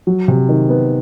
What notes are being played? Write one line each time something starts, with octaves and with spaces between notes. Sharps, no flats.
F#3
C3
D#3
B3